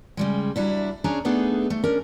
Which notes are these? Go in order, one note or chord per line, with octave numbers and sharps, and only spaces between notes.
C#3 G3 G#3
F#3 G3 D4 E4
C#4 D4 G#4 C#5 A#5
A3 B3 D4 D#4 G#4 A4
A3
C#4 D4 A#4